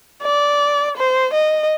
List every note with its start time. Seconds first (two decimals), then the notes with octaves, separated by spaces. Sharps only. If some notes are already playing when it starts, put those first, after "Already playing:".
0.23 D5
0.97 C5
1.34 D#5